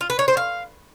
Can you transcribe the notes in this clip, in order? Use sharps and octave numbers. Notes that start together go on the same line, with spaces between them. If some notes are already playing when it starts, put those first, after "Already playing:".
F4
B4
C#5
C5
F5